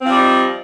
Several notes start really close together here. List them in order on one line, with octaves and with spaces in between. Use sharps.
C4 F3 G3 D#4